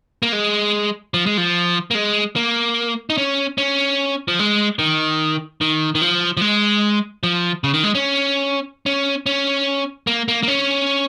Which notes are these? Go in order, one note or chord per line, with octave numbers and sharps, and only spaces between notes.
A#3
G#3
F3
G#3
F3
A#3
G#3
A#3
D#4
C#4
C#4
F3
G#3
D#3
D#3
D#3
F3
F3
G#3
F3
C#3
D#3
G#3
C#4
C#4
C#4
A#3
A#3
A#3
C#4